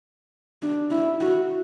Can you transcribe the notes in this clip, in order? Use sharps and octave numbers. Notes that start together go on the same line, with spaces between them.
D4
E4
F#4